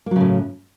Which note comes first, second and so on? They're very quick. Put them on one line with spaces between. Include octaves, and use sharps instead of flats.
A#3 F#3 C#3 A2